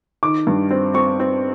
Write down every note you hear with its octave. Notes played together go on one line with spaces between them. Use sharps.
D#3 D6
G2
C4
C4 C#6
C4